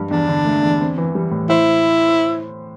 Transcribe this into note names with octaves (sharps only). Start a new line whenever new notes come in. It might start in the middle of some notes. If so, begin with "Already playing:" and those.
Already playing: G2
E2 D4
D3
A3
E2
C4
E3
G3
A2
E4 C5